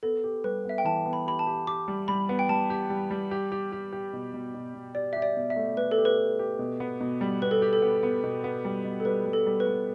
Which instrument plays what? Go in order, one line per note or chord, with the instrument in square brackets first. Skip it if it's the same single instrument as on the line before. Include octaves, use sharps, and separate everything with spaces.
[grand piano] B3 [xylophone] A4
[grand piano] G4
[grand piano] G3 [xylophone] B4
[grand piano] B3 [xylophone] E5
[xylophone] G5
[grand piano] E3 [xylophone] A5
[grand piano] B3
[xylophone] B5
[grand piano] G4 [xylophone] B5
[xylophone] A5
[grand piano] G4
[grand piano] G4 [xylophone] D6
[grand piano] G3
[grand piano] G3 [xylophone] B5
[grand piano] B3
[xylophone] G5
[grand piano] G3 [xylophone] A5
[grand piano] G4
G3
G3
G4
G4
G4
G4
B2
B2
B2
B2
[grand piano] G4 [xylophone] D5
[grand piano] G4 [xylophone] E5
[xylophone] D5
[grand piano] B2
[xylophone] E5
[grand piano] A3
[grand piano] A3 [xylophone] B4
[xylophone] A4
[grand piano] G4
[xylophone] B4
[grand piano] G4
G4
B2
B3
B2
G3
[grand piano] B3 [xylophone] B4
[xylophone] A4
[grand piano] G4
[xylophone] A4
[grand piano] B3
B3
B2
B3
G3
B2
[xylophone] A4
[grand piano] G3 [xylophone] B4
[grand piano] G3
[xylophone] A4
[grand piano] G3
[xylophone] B4
[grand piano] G3